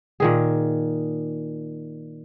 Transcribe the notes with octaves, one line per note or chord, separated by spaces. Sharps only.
A#2 D#3 G#4